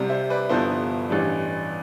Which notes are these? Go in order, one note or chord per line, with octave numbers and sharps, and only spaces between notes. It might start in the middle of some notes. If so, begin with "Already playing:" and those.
Already playing: C2 C3 G3
C5 E5
B4 D5
G1 G2 F3 B3 E4 A4 C5
A1 G2 E3 G3